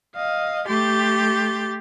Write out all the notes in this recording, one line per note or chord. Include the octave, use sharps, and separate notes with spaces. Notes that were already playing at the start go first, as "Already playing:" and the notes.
D#5 F5
A3 G4 C6 G6 A6